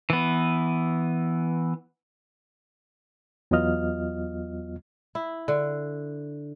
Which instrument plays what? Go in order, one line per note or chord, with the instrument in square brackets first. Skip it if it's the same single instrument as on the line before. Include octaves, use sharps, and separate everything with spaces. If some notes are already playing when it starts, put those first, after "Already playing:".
[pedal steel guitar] E3 B3
[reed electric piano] E2 F#3 B3 F4 D#5 F6
[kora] E4
D3